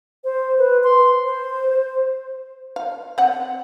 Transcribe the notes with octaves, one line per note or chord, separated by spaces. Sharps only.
C5
B4
C6
C5
F5
C4 F#5